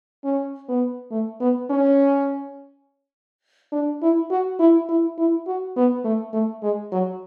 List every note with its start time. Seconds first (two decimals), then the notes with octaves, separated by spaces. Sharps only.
0.24 C#4
0.68 B3
1.11 A3
1.41 B3
1.70 C#4
3.72 D4
4.02 E4
4.31 F#4
4.59 E4
4.89 E4
5.18 E4
5.47 F#4
5.76 B3
6.04 A3
6.33 A3
6.63 G#3
6.92 F#3